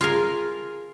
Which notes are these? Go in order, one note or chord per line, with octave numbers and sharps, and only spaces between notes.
F4 G#4 A#4